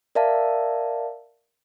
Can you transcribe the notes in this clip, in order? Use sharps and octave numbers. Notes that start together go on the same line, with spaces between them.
A#4 D5 E5 F5 A5